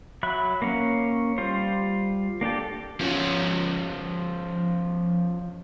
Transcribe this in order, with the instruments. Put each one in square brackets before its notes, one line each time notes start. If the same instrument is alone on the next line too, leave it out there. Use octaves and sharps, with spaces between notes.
[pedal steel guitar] F#3 E5 B5 F#6
A#3 C#4
G3 F4 C5
A#3 D4 G4 A4
[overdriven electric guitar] F3 C#4